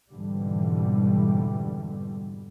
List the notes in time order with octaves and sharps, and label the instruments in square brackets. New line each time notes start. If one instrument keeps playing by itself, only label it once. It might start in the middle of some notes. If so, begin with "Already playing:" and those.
[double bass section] F2 G#2 B2 D3 E3 G3